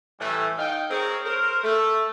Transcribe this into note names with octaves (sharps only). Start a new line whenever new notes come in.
A2 E3 G3 A3
D#4 F5 G5
C4 G#4 A#4 C#5
A#4 C5
A3